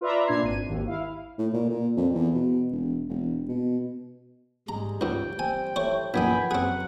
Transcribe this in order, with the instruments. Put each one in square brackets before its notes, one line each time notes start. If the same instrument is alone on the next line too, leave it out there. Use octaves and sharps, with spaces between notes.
[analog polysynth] F4 B4 D5 E5 A#5 B5
A#2 D4 G#6 C7
G#1 D#7
G#1 D#2
E4 F5
[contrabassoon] A2
A#2
A#2
F2
E2
B2
E1
E1
B2
[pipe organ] G#2 G3 G#3 [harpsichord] A#5
[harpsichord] C#2 G#2 [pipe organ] G3 G5
[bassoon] C4 [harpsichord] G#5
[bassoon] A2 [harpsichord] C5 C#5
[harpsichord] A#1 F#2 D#4 [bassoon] B3 [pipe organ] G5 G#5 B5
[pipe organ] F#2 F#3 F#5 [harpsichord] C4 G#4